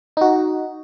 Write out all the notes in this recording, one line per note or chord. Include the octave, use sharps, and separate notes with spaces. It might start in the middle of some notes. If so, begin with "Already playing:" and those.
D#4 F#4